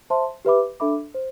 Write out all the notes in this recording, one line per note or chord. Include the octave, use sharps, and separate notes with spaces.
C5 E5 A5 C6
G4 B4 E5 B5 D6
D4 A4 E5 B5 D6
C5